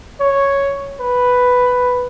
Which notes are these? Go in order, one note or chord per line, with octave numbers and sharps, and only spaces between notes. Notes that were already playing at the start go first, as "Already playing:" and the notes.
C#5
B4